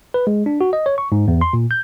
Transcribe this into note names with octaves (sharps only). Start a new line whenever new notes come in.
B4
G#3
D4
F#4
D#5
C#5
C#6
G#2
E2
C6
A#2
G6